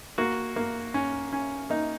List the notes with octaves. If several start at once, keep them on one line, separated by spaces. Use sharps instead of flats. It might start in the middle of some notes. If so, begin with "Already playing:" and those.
A#3 F#4
A#3
C#4
C#4
A#3 D#4